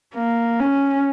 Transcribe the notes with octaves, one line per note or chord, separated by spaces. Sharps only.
A#3
C#4